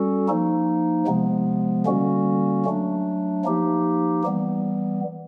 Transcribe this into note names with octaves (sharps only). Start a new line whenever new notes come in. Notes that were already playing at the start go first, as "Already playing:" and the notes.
Already playing: G3 C#4 F#4 A4
F3 A#3 D#4
C3 F3 G#3 B3
D3 G3 A#3 C#4 F#4
F#3 A3 D4
F3 A#3 D#4 G4
E3 G3 B3